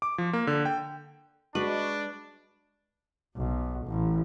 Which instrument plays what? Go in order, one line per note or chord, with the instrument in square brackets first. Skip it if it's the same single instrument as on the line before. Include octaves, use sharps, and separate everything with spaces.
[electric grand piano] D6
F3
A#3
D3
G5
[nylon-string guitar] G#3 [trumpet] D4 [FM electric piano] F#4 D#5 C#6 [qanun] B4
[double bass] B1
A1